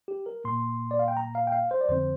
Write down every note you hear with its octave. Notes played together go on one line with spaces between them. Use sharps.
G4
A#4
A#2 A#3 C6
D5
F5
G5
A#5
F5
G5
F5
C5
D5
F2 D3 F3 C4 C5